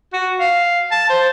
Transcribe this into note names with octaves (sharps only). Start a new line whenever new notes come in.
F#4
F5
A5
C5